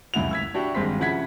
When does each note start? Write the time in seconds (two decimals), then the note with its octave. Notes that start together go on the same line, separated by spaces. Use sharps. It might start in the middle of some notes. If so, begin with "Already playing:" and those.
0.14 F1 C#2 F#2 E4 F#5 F7
0.31 E6 G#6 B6
0.54 D4 E4 F#4 G4
0.74 G#1 G2 G#3 C4 C6 B6
0.99 C#3 F3 E4 F#5 G#6 B6